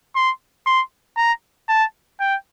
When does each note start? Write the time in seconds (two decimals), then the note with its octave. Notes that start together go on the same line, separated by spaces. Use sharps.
0.16 C6
0.66 C6
1.17 A#5
1.69 A5
2.20 G5